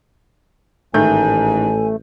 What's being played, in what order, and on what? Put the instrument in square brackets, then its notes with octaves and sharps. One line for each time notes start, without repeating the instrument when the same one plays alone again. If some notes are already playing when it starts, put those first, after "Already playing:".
[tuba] A1 [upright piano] G#2 D#3 G6 [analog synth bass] A3 [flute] G#5